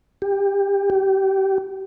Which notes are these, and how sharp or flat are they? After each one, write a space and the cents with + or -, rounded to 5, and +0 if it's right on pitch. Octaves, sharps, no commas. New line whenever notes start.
G4 +20
G4 -25